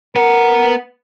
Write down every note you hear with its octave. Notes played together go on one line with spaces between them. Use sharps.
B3 A#4 F#5